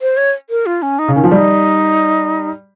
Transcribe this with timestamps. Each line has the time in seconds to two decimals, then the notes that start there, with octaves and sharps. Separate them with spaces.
0.02 C5
0.17 C#5
0.50 A#4
0.66 F4
0.82 C#4
0.99 D#4
1.08 C#3
1.15 D#3 C#4
1.24 F3
1.31 G3 F4
1.36 D#4